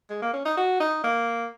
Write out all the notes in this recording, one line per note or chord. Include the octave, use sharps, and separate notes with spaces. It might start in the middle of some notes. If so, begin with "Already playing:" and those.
G#3
A#3
C#4
D#4
F#4
D#4
A#3